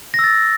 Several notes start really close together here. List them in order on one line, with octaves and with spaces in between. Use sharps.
A#6 E6 A6